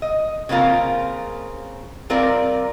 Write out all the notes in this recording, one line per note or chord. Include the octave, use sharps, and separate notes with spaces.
D#5
C#3 A#3 C4 F4 A#4
G3 C4 F4 A#4 D5